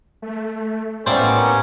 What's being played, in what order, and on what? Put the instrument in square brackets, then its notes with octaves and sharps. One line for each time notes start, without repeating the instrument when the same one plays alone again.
[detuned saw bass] A3
[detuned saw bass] A2 [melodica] A#3 B3 G4 [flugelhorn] C#4 [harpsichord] C5 D5 E5